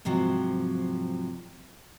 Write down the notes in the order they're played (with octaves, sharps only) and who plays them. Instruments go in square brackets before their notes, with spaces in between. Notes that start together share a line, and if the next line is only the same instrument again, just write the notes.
[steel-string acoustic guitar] G#2 C3 F3 F#3